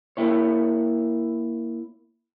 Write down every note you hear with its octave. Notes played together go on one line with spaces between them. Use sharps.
A#3 E4 C#5